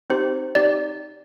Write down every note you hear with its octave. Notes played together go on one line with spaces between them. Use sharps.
C4 D#4 G4 C5
C4 D#4 G4 D5